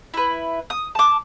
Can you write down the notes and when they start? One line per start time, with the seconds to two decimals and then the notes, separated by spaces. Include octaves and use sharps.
0.14 E4 B4
0.70 D#6
0.95 A5 D6